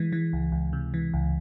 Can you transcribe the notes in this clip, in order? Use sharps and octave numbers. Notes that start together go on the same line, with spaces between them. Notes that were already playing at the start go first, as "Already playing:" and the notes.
Already playing: E3 G#3
E3
C#2
C#2
C3
E3
C#2